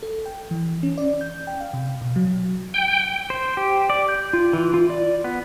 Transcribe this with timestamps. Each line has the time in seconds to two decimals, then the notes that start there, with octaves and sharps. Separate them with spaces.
0.03 A4
0.26 G5
0.51 E3
0.83 C#4
0.98 D5
1.21 G6
1.47 G5
1.60 F5
1.74 C3
2.01 B2
2.16 F#3
2.74 G5
3.30 C5
3.57 G4
3.90 D5
4.09 G6
4.33 F4
4.53 E3
4.74 F4
4.90 D5
5.24 B3